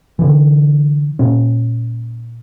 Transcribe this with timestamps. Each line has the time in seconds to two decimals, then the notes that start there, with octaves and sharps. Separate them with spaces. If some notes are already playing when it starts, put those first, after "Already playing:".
0.19 D3 E3
1.19 A#2 C#4